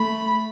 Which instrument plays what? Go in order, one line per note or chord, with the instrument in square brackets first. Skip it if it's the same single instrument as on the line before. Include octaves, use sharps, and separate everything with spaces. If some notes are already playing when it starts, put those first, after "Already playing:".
Already playing: [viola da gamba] A3 [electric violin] B5